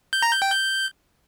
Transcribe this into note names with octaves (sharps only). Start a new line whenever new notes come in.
G6
A#5
G6
G5
G6